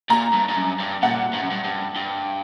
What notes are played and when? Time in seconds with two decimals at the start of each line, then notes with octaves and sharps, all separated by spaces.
0.10 A#2 A#5
0.33 G2
0.49 G2
0.56 F#2
0.79 G2
1.02 A#2 F#5
1.33 G2
1.42 F#2
1.50 G2
1.64 G2
1.96 G2